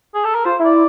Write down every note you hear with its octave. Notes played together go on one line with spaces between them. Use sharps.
G#4
A4
A#4
F4 C5
E4
D5